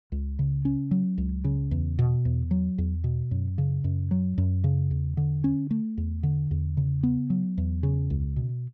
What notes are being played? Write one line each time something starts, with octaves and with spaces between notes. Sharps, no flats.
C#2
C#3
C#4
F#3
C#2
C#3
E2
B2
E2
F#3
E2
B2
F#2
C#3
F#2
F#3
F#2
C#3
E2
D3
C#4
A3
E2
D3
E2
C#3
B3
F#3
E2
C#3
C#2
B2